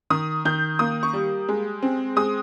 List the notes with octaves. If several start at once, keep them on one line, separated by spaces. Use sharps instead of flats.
D#3 D#6
D#3 G6
A#3 D#6
C#6
G3
G#3
C4
G#3 D#6